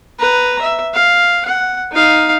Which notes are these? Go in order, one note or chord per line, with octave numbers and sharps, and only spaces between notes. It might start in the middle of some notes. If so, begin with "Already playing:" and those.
B4 A#5
E5
F5
F#5
D#4 F5